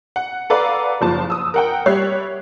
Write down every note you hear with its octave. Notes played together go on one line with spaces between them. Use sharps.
F#5
A4 B4 D5 F5 F#5 A#5
F#1 F3 A5
D#6 E6
A#4 F#5 G5
G3 C#5 E5 F#6 C7